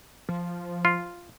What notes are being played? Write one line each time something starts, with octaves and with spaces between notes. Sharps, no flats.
F3
F4